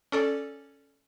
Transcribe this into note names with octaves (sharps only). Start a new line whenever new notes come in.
C#4 A4 D5